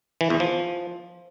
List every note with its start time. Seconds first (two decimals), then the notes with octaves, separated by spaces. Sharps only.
0.21 E3
0.30 E2
0.40 F3